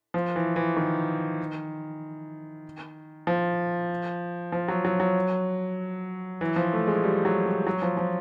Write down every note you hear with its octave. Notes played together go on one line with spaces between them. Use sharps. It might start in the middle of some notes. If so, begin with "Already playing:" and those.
F3
E3
E3
D#3
F3
F3
F#3
F#3
F#3
E3
F3
A3
G#3
G3
F#3
G3
F#3
F3
F3